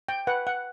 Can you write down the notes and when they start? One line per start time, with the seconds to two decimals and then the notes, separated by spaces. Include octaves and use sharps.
0.09 G5
0.27 B4 F#5
0.47 F#5